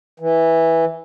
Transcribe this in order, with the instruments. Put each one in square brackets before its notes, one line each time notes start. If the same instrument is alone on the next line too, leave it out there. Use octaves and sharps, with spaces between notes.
[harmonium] E3